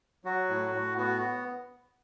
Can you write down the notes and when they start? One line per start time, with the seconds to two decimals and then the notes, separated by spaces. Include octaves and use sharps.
0.25 F#3 F#4
0.50 A2
0.73 A2
0.98 B3 F#4